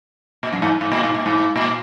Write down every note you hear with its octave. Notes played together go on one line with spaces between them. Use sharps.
A#2
F#2
G#2
G#2
A#2
G#2
A#2
G#2
A#2